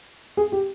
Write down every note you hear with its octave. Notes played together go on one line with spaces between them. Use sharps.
G#4
G4